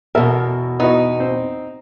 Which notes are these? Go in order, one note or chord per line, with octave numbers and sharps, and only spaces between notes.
E2 B2 A4 A#4 E5
B3 D#4 E4 F#4
C4